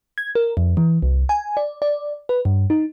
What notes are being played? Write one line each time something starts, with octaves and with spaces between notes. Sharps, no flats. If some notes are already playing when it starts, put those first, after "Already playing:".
G#6
A#4
F2
E3
C2
G#5
D5
D5
B4
G2
D#4